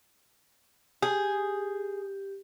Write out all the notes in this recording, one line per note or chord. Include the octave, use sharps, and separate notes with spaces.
G4 G#4